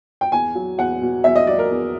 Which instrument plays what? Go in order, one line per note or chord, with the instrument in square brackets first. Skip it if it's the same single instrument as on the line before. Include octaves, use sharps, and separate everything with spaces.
[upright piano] G5
E2 G#5
F#3
E2 F#5
B2
E2 E5
D#5
F#3 D5
A#4
E2